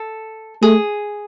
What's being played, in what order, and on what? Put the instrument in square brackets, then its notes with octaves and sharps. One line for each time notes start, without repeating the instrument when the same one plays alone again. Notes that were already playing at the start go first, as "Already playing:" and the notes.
Already playing: [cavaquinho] A4
[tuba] A3 [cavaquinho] G#4